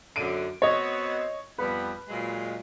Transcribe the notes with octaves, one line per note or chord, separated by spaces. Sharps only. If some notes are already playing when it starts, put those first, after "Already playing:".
F#2 D3 D7 D#7
B3 C4 F#4 C#5 D#5
F2 G3 B3 B4
A#2 F#3 G#3